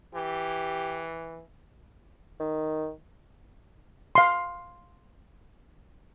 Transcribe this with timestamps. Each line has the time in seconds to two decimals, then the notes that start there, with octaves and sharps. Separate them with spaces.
0.15 E3 G4
2.40 D#3
4.15 F5 C6